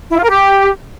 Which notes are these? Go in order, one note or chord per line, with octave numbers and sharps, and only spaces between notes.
E4
F4
A#4
G4